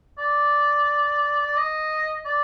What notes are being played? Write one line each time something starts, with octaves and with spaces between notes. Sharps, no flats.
D5
D5
D#5
D5